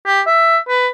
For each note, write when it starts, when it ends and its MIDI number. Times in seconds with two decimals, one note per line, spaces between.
0.06 0.21 67
0.27 0.58 76
0.68 0.88 71